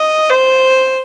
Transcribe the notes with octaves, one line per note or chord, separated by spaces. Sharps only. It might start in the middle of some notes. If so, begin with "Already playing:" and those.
Already playing: D#5
C5